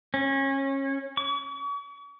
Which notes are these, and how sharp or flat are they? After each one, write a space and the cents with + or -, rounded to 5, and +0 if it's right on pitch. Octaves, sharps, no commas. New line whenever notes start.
C#4 -25
C#6 +40